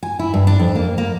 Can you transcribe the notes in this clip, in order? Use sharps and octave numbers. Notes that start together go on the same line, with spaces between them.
G#5
E4
G2
D4
F2
A#3
A#3